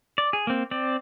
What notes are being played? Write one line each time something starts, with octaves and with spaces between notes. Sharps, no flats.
D5
G#4
A#3 C4
C4 D5